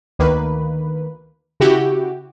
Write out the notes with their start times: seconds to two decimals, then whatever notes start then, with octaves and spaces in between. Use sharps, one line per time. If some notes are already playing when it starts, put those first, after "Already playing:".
0.19 D2 D#3 A#3 B4
1.60 C#3 E4 F#4 G4